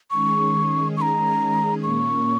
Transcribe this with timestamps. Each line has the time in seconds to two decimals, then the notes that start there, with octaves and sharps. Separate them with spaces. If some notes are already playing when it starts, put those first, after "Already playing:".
0.10 D#3 G#3 C#4 G#4 C#6
0.97 C#6
1.01 A#5
1.83 A#2 A#3 C#4 C#6